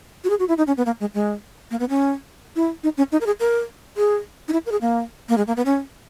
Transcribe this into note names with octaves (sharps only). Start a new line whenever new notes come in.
F#4
G#4
F#4
E4
D#4
C#4
B3
A#3
G#3
G#3
A#3
B3
C#4
E4
D#4
C#4
D#4
A#4
G#4
A#4
G#4
D#4
E4
A#4
G#4
A#3
A#3
G#3
A#3
B3
C#4